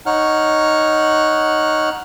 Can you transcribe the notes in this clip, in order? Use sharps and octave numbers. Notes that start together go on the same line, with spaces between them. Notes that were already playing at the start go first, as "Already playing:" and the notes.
D#4 C#5 F#5 F6 F#6